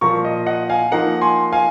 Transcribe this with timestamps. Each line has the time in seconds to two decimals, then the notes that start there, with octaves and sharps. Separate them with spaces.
0.01 A#2 F3 A#3 A#5 C#6
0.25 D#5
0.47 D#5 F#5
0.69 F5 G#5
0.91 F3 A#3 D#4 F#5 A#5
1.21 G#5 C6
1.52 F5 G#5